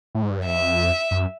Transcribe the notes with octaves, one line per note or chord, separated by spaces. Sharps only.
A2
G#2
G2
F#2
F2 E5
F#2